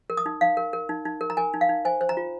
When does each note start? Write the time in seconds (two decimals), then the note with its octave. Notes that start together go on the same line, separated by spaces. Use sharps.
0.10 A#4
0.17 D#6
0.26 D#4
0.41 D#4 F5
0.57 A#4
0.73 A#4
0.89 D#4
1.05 D#4
1.21 A#4
1.30 A#5
1.37 A#4 G#5
1.54 D#4
1.61 F5
1.69 D#4
1.85 C5 G#5
2.01 C5
2.09 A#5
2.17 F4